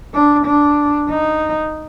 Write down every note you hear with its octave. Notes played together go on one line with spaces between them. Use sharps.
D4
D4
D#4